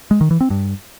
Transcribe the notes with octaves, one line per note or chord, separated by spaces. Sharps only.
G#3
D#3
E3
C4
G2